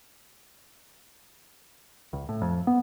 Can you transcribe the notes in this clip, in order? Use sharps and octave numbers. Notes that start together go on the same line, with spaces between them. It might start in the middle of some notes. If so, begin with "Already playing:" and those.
C#2
A2
F2
B3